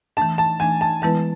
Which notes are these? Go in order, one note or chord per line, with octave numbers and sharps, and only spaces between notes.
E3 A3 D4 A5
A5
E3 A3 D4 G#5
A5
E3 G#3 B3 E4 B4 A5